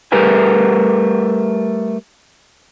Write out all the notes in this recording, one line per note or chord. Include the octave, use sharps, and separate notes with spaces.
G3 A3 G4 A#4 B4 G#5